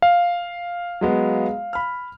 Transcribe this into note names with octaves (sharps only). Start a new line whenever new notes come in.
F5
F#3 G#3 B3
B5 F6